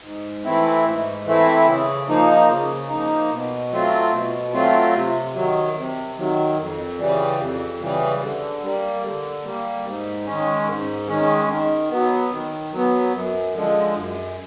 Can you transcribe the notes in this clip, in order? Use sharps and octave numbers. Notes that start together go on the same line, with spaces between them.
G#2
E3 A3 C4 E4
G#2
E3 A3 C4 E4
C#3
F3 A#3 D#4
C#3
F3 A#3 D#4
B2
F#3 A3 C4 F4
B2
F#3 A3 C4 F4
C3
D#3 F#3
C3
D#3 F#3
F2
C#3 E3 G3
F2
C#3 E3 G3
D3
G3 A#3
D3
G3 A#3
G#2
D#3 G#3 C#4
G#2
D#3 G#3 C#4
D#3
F#3 B3
D#3
F#3 B3
F#2
D3 F3 G#3
F#2